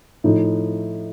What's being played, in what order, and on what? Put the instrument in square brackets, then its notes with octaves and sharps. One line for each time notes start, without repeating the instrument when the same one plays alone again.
[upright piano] A2 F3 D#4